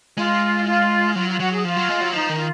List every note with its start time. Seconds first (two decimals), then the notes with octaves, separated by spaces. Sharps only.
0.17 G#3 F4
0.66 F4
1.15 F#3 F4
1.28 F4
1.39 F#3 F#4
1.51 G#4
1.64 F3 F4
1.77 F#3
1.89 G#3
2.01 F#3
2.13 F3 D#4
2.29 D#3
2.37 F4